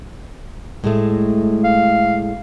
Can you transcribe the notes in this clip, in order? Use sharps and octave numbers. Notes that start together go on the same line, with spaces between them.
A2 G#3 A3
F5